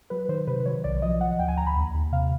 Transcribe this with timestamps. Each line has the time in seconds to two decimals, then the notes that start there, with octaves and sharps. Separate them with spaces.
0.10 F#3 B4
0.29 D#3 C5
0.47 C3 B4
0.66 F#3 C#5
0.84 B1 D5
1.02 F3 D#5
1.21 F3 F#5
1.39 D2 G5
1.48 G#5
1.57 D2 A#5
1.67 B5
1.76 D#2
1.94 D#2
2.12 C3 F5